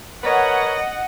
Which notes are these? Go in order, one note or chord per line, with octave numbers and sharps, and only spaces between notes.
A#4 B4 C#5 D#5 F#5